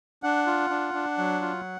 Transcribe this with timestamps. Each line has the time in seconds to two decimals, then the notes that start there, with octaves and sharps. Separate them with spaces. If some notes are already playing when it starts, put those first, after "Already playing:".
0.23 D4 F#5
0.47 F4
0.70 D4
0.94 D4
1.18 F#3
1.41 F4